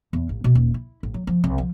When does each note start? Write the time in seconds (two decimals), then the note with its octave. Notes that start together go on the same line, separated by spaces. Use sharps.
0.13 E2
0.29 A1
0.44 B2
0.55 D#1
0.74 E4
1.03 A1
1.14 F#3
1.27 F3
1.44 C2
1.58 F3